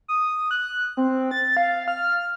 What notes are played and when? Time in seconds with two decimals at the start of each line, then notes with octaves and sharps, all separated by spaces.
0.08 D#6
0.51 F#6
0.97 C4
1.31 A6
1.57 F5
1.88 F6